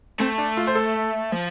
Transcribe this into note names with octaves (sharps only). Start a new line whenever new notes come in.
A3 C4
D4
F4
C5
A4
F3